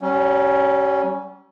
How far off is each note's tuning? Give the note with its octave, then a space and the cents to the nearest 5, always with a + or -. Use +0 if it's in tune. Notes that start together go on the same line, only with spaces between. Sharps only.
G3 -40 C#4 +0